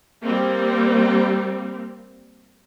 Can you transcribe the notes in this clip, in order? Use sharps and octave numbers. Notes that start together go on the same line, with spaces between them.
G3 A#3 C4